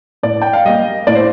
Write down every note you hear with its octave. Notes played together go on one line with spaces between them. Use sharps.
A2 D5
G5
F5
G3 A#3 D#5
A2 D5
C5